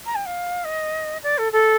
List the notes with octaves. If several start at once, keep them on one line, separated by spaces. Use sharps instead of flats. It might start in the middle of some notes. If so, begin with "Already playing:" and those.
A#5
G5
F5
D#5
D5
A4
A4